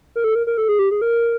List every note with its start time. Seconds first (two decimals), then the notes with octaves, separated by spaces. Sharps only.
0.16 A#4
0.24 A4
0.35 A#4
0.47 A#4
0.58 A4
0.69 G#4
0.79 G4
0.91 G#4
1.02 A#4